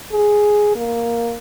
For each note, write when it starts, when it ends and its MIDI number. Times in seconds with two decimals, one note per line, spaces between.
0.12 0.74 68
0.76 1.37 58